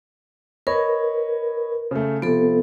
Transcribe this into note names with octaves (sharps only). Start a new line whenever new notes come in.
A#4 B4 C#5 D#5 B5
C#3 A3
C3 F3 B3 A4